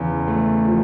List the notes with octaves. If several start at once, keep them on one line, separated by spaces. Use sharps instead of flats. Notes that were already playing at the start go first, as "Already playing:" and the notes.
Already playing: E2 C#3
A3
F3